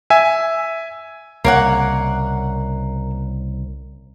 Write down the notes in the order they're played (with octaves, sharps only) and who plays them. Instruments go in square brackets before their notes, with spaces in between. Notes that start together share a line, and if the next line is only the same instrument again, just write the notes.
[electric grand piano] E5 G#5
[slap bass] C2 C#3 [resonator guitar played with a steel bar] A#3 C#5 F#5